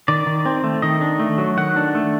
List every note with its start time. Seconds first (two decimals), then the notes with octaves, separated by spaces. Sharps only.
0.08 D#3 D5
0.26 D#3
0.46 C4
0.64 A3
0.82 D#3 D#5
1.01 D4
1.20 A3
1.38 F#3
1.57 D#3 F#5
1.76 D4
1.95 A3